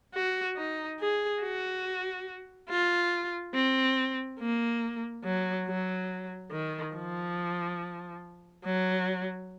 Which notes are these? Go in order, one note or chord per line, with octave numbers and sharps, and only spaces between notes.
F#4
D#4
G#4
F#4
F4
C4
A#3
F#3
F#3
D#3
F3
F#3